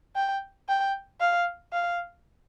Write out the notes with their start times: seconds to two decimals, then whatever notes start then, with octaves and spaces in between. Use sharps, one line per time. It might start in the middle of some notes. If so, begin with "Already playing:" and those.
0.16 G5
0.68 G5
1.20 F5
1.73 F5